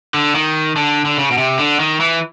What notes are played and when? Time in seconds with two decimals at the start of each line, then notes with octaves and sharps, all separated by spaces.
0.14 D3
0.35 D#3
0.76 D3
1.05 D3
1.18 C#3
1.31 B2
1.38 C3
1.59 D3
1.80 D#3
2.00 E3